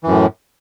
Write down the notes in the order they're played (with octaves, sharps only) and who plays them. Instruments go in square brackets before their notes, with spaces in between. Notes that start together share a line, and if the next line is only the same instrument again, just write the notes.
[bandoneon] E3
F#2
A2